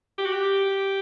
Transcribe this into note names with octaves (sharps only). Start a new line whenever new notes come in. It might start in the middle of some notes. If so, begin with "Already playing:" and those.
G4
F#4
G4